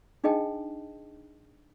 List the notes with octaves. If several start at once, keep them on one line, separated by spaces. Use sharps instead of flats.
D4 D#4 G#4 D#5 G5 A5